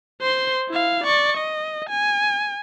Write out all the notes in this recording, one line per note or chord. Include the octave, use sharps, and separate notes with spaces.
C5 C6
E4 F5
D5 C#6
D#5
G#5